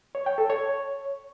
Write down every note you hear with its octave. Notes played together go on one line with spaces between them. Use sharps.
C#5
G5
A4
C#5